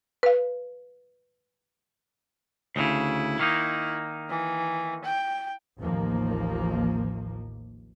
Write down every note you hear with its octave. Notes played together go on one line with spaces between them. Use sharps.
B4 F5
D2 A2 C#3 E4
D#3 A#3 D#4
E3
G5
A1 D#2 F3 A#3